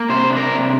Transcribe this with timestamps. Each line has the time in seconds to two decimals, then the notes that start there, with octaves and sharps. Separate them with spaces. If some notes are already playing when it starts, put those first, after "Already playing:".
Already playing: A#3
0.09 C3 C5
0.31 D4
0.37 A#4
0.51 C3